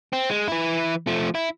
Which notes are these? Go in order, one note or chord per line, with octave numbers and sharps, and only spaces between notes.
C4
G#3
E3 E4
F3 A3
E4